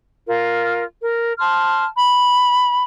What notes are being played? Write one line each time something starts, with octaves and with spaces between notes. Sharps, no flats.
F4 A#4
A#4
A5 C6 F6
B5